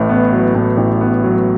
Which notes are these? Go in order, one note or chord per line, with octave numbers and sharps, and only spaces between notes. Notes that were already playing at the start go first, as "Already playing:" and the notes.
Already playing: A1 A2
B3
F#3
A2
A1
B3
F#3